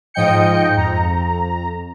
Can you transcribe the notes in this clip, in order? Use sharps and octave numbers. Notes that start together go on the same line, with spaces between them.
G#2 F3 D#5 G5 G6 C#7
F2 A#5